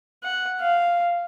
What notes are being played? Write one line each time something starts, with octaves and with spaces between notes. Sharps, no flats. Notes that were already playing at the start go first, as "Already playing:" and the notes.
F#5
F5